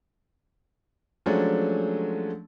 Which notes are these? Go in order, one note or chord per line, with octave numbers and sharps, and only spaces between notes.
F3 F#3 G#3 A3 C#4 D4